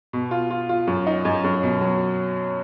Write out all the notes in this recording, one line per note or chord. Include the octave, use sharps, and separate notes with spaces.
B2
F4
F4
F4
F#2
D#4
F#2
F#2
B2
F#3